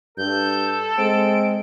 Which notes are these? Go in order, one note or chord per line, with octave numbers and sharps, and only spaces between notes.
G2 A4 G6
G#3 C4 D7